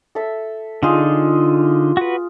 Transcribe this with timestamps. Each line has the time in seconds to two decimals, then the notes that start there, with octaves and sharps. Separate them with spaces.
0.15 A4 E5
0.83 D3 D#4 F4 G#4
1.97 F#4 B4